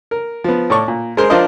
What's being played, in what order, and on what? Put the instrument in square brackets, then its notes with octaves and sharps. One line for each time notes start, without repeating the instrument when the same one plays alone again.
[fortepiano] A#4
F3 B3
A2 A4 D5 C#6
A#2
G#3 G#4 A#4 C5
F3 D4 F4 A#4 C5 D#5